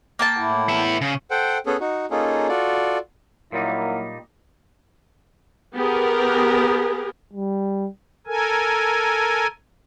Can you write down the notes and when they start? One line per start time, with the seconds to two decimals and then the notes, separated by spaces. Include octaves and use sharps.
0.19 A#3 G5 A5
0.37 A2 E4 F#5
0.69 B3 E5
1.01 C#3
1.31 A4 C5 F#5 G5
1.66 B3 C#4 G#4 A4
1.80 D#4 F#4
2.11 A#3 C#4 D#4 F4 G#4 A4
2.48 F4 F#4 A4 D5
3.52 A#2 F#3 G3 A#3 D#4 E4
5.74 B3 G4 G#4 A#4
7.33 G3
8.27 A4 A#4 G#5